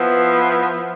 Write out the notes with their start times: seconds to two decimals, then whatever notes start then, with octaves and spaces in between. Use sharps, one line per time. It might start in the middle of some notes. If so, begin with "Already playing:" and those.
Already playing: F3 B3 E4